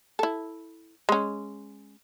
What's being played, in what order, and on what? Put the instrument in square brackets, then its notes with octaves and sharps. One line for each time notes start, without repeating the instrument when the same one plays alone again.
[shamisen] E4 A4
G#3 C#4